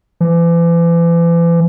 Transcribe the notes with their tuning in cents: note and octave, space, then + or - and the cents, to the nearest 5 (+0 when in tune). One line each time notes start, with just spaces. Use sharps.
E3 +40